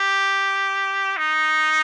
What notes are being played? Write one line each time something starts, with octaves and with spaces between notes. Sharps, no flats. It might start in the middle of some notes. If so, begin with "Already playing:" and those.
Already playing: G4
D#4